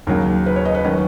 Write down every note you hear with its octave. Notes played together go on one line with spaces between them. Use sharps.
D#2 C#3 F#3 A#4
B4
C#5
D#5
B4
D#3 F#3 C#4